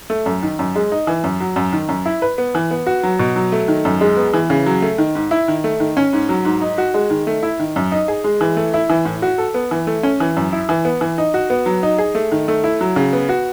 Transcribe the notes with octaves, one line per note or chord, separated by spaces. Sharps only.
A3
F#2
D#3
F#2
G#3
D#4
E3
F#2
F#3
F#2
D#3
F#2
E4
B4
B3
E3
B3
F#4
F#3
B2
F#3
A3
D#3
F#2
G#3
B3
E3
C#3
F#3
A3
D#3
G#2
E4
D#3
A3
D#3
C#4
G#2
F#3
G#2
D#4
F#4
G#3
D#3
A3
E4
D#3
F#2
D#4
G#4
G#3
E3
A3
E4
E3
A2
F#4
A4
B3
E3
A3
C#4
E3
F#2
E4
E3
B3
E3
D#4
F#4
B3
F#3
D#4
G#4
A3
D#3
A3
E4
F#3
C#3
B3
F#4